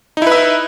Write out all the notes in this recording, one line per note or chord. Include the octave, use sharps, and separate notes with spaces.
D#4 E4 B4 E5